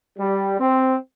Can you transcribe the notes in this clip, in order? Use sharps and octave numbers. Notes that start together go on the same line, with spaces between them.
G3
C4